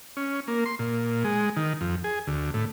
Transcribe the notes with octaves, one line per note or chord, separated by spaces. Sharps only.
C#4
A#3
C6
A#2
G#3
D#3
F2
G#4
D2
A2